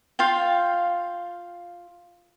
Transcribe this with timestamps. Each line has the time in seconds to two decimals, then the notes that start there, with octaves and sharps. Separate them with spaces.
0.19 F4 F5 G5